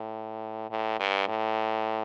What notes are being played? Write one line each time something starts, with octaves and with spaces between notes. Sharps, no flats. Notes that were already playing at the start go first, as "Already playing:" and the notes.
Already playing: A2
A2
G2
A2